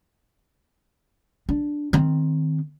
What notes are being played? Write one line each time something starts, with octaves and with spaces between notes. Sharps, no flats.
D4
D#3 C4